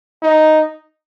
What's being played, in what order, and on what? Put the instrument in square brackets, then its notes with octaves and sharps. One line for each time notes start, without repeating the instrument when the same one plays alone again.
[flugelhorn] D#4